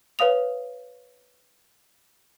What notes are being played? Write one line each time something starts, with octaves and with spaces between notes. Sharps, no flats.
B4 C#5 F5 D#6 F7